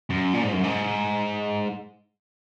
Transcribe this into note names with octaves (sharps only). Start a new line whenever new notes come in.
F#2
A#2
G#2
F#2
G#2